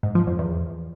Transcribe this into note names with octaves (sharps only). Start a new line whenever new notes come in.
G#2
F3
F2
E2